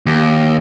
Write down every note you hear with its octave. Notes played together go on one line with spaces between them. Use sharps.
D#2